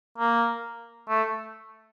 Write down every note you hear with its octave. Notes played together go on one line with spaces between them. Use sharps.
A#3
A3